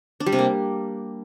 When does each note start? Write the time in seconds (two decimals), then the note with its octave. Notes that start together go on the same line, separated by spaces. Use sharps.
0.20 D4
0.26 G3
0.32 C3
0.39 A#3